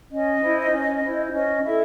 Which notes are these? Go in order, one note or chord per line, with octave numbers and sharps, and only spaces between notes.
C#4 D#5
E4 C5
C#4
E4 C5
C#4 D#5
E4 A4 E5